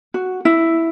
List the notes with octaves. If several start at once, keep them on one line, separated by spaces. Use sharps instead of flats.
F#4
E4